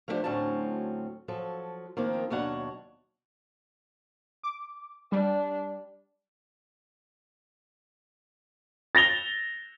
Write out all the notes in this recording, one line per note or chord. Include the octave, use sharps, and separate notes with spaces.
F3 A3 B3 D4 G4 C5
D2 A2 F#3 C4 C#4 A5
F3 F#3 A4
D#3 F3 A#3 C4 F4
D#2 B2 F#3 D4 C#5 F#5
D6
G3 D4
A6 A#6 F7 G7